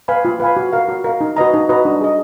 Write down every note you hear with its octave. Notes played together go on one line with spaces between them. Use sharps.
B4 F5 G#5 B5
F4
B4 F5 G#5 B5
F#4
A#4 F5
F#4
A#4 F5
D#4
F#4 B4 D#5 A#5
D#4
F#4 B4 D#5 A#5
D4
G#4 D#5